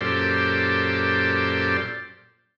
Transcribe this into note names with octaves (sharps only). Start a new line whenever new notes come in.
F#2 A#2 G4 A4 C5 D5